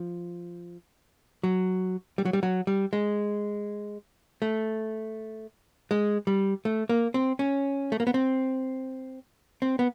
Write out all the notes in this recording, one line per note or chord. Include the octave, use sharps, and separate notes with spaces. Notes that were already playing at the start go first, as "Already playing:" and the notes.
Already playing: F3
F#3
G3
F#3
G3
F#3
G3
G#3
A3
G#3
G3
A3
A#3
C4
C#4
A3
A#3
B3
C4
C4
B3